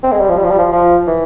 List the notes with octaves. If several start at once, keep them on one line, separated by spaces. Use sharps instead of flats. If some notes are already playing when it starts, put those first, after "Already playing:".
C4
G#3
G3
F3
G3
F3
G3
F3
F3
E3